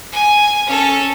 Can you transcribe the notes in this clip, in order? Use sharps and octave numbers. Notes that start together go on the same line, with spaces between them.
G#5
C#4 A4